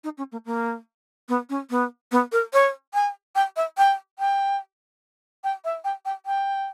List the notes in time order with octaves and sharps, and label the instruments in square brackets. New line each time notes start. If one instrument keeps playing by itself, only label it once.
[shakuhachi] D#4
C#4
A#3
A#3
B3
C#4
B3
B3
A#4
C#5
G#5
G5
E5
G5
G5
G5
E5
G5
G5
G5